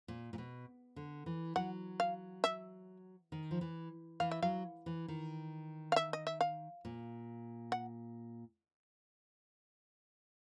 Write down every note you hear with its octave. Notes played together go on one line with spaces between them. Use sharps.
A#2
A#2
B2
D3
E3
F#3 F#5
F5
E5
D#3
F3
E3
E3 F5
E5
F#3 F5
E3
D#3
F5
E5
D#5
E5
F5
A#2
F#5